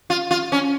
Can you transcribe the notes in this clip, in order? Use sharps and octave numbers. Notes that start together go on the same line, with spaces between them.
F4
F4
C#4